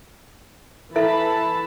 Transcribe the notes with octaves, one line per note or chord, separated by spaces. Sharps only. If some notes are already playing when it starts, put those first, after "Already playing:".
E3 E4 A4 E5 A5 B5